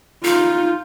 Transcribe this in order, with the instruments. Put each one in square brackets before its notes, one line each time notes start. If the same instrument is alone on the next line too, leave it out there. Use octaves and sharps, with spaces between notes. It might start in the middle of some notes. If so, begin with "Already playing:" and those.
[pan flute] D#4 [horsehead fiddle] F4